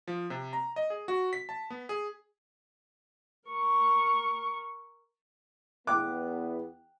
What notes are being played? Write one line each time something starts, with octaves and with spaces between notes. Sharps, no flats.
F3
C3
A#5
D#5
G#4
F#4
B6
A5
B3
G#4
A#4 C#6
E2 B3 G5 D6 F#6